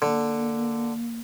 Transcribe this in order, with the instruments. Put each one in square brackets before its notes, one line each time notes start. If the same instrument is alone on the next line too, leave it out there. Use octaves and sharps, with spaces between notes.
[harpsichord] D3 [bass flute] A#3